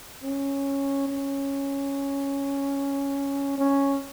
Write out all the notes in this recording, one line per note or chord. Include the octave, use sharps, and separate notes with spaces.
C#4
C#4
C#4